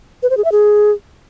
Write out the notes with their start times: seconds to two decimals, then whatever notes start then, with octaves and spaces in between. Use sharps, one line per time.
0.23 B4
0.30 C5
0.37 G#4
0.45 E5
0.52 G#4